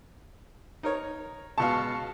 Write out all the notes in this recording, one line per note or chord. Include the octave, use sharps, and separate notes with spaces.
D#4 A#4 C#5
C#2 B2 F5 A5 C#6